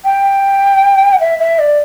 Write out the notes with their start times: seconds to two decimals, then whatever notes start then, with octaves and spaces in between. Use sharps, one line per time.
0.05 G5
1.13 F#5
1.20 E5
1.39 E5
1.59 D5